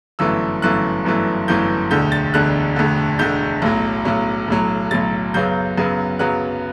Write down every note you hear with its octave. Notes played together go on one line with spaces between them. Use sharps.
G1 F#2 E3 A3 E6
G1 F#2 E3 A3 F#6
G1 F#2 E3 A3
G1 F#2 E3 A3 G6
E1 D2 D3 G6
A6
E1 D2 D3 F#6
E1 D2 D3
E1 D2 D3 G6
B1 A2 F#3
B1 A2 F#3
B1 A2 F#3
B1 A2 F#3 A6
F#2 C#3 F#3 B3 G6
F#2 C#3 F#3 B3
F#2 C#3 F#3 B3 F#6